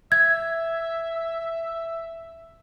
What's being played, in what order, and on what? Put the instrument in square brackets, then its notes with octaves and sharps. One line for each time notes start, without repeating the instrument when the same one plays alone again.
[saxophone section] E5 [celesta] G#6